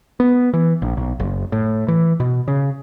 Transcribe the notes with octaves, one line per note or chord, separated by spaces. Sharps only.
B3
E3
A#1
B1
F#1
A2
E3
B2
C#3